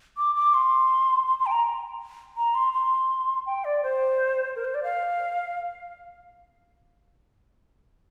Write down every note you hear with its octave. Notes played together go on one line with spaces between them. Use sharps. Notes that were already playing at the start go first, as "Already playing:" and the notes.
D6
D6
C6
C6
C6
G5
A#5
A#5
C6
C6
G5
D5
C5
A#4
C5
D5
F5